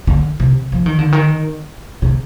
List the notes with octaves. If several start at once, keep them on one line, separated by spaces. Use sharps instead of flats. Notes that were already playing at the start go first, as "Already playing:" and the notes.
D3
C3
F3
D#3
D3
D#3
C3